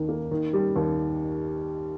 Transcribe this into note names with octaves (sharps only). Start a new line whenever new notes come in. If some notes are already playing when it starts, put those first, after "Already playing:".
Already playing: D#2 D#3
A#3
D#3
G3
D#2